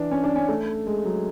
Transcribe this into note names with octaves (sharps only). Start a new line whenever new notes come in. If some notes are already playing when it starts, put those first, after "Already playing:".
Already playing: E3 D4
C#4
D4
C#4
A3
G#3
F#3